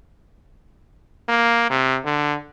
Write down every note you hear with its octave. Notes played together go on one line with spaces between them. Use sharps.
A#3
C3
D3